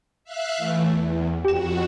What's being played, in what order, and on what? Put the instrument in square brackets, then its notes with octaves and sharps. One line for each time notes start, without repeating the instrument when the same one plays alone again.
[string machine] E5 F5 F#6
E3 A3
E2
[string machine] F2 F#4 [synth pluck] G4 E7